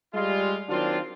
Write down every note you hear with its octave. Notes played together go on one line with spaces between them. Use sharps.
G3 G#3 F4
D#3 F#3 A#3 C4 D4 F4